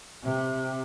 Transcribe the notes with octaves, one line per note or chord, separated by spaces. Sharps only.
C3